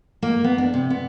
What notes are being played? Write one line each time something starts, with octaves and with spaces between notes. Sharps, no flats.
A#3
B3
D4
C3
B3